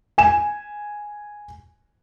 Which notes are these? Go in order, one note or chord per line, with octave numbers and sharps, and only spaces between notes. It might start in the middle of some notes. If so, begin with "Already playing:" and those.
G#5 E7